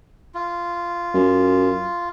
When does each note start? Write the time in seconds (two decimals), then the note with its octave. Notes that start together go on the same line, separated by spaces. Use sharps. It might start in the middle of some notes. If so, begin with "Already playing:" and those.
0.35 F4
1.14 F#2